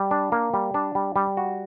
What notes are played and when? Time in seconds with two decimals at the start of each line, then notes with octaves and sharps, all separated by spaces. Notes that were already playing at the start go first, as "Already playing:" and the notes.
Already playing: G3
0.11 D4
0.32 A#3
0.54 G3
0.74 D4
0.95 G3
1.16 G3
1.37 F#4